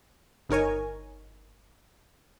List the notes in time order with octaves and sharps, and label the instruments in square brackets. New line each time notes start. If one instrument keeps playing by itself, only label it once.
[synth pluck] G1 D#4 A#4 C#5 G#5